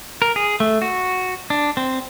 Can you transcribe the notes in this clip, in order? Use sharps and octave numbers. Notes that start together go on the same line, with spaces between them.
A#4
G#4
A3
F#4
D4
C4